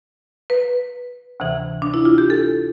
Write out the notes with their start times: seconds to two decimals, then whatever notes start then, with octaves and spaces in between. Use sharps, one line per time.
0.50 B4
1.40 D2 C3 E3
1.82 D4
1.94 E4
2.05 F4
2.18 G4
2.30 A4